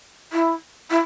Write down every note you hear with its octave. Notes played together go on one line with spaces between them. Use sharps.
E4
E4